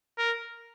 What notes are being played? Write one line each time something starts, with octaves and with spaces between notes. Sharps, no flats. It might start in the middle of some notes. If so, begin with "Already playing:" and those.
A#4